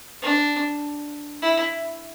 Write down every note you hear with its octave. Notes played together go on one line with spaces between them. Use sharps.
D4
E4